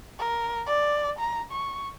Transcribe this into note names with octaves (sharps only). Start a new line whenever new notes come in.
A#4
D5
A#5
C#6